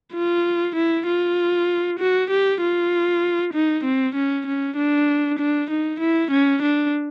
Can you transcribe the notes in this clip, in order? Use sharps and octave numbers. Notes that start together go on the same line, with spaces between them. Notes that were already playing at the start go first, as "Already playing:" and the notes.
F4
E4
F4
F#4
G4
F4
D#4
C4
C#4
C#4
D4
D4
D#4
E4
C#4
D4